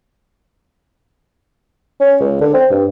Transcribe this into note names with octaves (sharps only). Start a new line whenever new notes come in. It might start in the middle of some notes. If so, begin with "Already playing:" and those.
C#4
C#2
D3
C4
G2